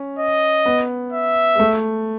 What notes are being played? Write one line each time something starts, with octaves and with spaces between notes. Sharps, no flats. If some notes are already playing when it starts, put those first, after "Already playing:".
Already playing: C#4
D#5
B3
E5
G#3
A3